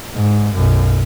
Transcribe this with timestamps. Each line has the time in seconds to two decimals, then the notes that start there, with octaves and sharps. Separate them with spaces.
0.14 G#2
0.55 B1 F#2